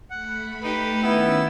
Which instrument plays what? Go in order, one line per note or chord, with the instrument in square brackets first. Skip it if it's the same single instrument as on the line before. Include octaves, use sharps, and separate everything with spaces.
[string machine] A3 B5 [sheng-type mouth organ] F#5
[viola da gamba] D#4 G4 [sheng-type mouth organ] B4
[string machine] D#3 C#4 E5 [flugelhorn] B3 [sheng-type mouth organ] E4 E6